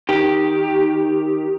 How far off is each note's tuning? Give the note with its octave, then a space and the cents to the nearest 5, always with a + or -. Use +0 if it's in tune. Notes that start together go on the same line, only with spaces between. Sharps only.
D#3 +0 G4 +0